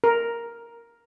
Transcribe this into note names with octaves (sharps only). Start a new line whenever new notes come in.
A#4